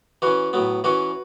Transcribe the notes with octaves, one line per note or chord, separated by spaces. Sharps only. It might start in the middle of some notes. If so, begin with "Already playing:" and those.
E3 C#4 F#4 B4
A2 F#3 B3
E3 C#4 F#4 B4